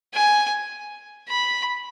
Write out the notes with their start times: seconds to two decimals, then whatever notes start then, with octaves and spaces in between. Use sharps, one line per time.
0.14 G#5
1.29 B5